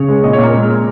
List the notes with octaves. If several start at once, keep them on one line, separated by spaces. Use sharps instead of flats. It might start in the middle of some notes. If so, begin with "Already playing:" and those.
Already playing: C#3 C#5
G#3
A#2 D#5
C#5
A#2
A#4
G#3
G#3